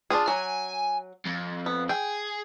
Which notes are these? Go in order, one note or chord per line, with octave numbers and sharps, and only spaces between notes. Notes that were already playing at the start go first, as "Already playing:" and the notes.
D4 F4 G#4
F#3 G#5
F2
B3
G#4 G5